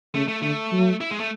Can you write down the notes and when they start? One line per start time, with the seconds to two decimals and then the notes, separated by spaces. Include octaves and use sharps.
0.14 C#3 A3
0.28 A3
0.42 D3 A3
0.72 F#3
1.01 E4
1.11 G#3
1.20 A3